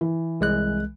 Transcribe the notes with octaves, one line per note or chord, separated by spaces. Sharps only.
E3
C2 G#3 F#6